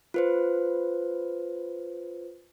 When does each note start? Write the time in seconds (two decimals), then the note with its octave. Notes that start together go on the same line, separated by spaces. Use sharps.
0.14 F4 B4 C5